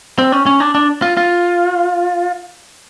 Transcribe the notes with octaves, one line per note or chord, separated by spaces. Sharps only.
C4
C#4
C#4
D4
D4
F4
F4